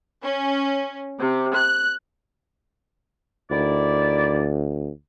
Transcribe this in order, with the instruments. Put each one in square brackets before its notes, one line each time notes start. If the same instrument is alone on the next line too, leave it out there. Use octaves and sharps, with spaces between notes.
[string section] C#4
C3
F#6
[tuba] D2 [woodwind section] D#3 E4 D5